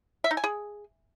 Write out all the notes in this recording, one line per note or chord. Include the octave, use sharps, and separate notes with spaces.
E5
D#4
G#5
G#4